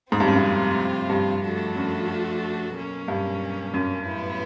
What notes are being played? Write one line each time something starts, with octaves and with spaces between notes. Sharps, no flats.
G#2 C3 F3 A3 C4 F4
G2
F#2
G2
G2
F3 A3 D4 F#4 A4
F#2
B2 F#3 A#3 C#4
G2
F#2
A2 F#3 B3 E4